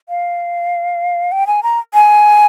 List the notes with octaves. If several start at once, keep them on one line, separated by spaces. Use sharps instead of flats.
F5
G5
G#5
A#5
G#5